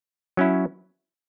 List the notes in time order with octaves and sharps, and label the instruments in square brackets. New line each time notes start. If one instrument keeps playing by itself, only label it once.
[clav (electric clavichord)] F#3 C#4 E4